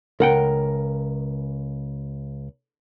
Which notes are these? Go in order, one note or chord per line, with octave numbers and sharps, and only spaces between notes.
C#2 A#4 F#5 G5